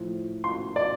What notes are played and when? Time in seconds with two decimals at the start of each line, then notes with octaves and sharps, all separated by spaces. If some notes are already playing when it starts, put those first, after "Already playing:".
Already playing: A2 F3
0.44 C6
0.76 D5